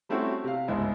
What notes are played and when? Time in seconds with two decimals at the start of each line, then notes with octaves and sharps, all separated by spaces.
0.09 G3 A3 C4 C#4 E4 F#4
0.44 C3 F5
0.68 G1 C#2 G#2 E4 D#5